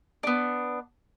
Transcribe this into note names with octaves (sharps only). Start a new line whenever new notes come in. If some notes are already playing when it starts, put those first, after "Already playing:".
B3 D4